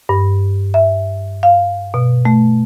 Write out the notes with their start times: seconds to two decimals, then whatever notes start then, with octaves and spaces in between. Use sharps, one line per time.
0.09 G2
0.74 E5
1.43 F5
1.94 B2
2.25 A3